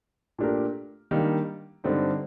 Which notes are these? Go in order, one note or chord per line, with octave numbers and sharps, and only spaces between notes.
A#2 A3 D4 G4 A#4
D#3 G3 A#3 D4
G2 D3 G3 C4 D#4